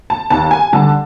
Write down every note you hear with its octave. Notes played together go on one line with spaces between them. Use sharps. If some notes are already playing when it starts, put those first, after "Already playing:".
A5
D#2 A5
G#5
D3 G3 A5